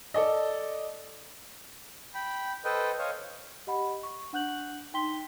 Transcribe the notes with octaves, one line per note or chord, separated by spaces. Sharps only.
A4 D5 D#5
G5 B5
A4 B4 C5 D#5 G5
C5 C#5 D#5 F5
G4 D#5 F#5 B5
C#6
D4 F#5 F#6 G6 F#7
D#4 G5 C6 B6 G7